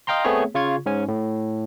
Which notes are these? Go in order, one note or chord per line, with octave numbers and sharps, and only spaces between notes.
D#5 F5 G5 A#5 C6
A3 B3 C4 G#4 C#5
C#3 F4 C#6 G#6
G#2 C#4 G#5
A2